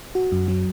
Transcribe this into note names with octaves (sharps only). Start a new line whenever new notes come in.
F#4
F#2
F#3